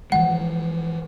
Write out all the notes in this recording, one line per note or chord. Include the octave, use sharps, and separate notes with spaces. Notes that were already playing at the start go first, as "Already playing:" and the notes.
E3 F3 G#3 F#5